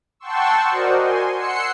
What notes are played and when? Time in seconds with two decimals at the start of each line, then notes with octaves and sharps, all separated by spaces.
0.20 F#5 G5 A5 C6 C#6 E6
0.69 F#4 A#4 C5 D5 D#5
0.99 G#5 C6
1.34 F#5 C6 E6 C7 C#7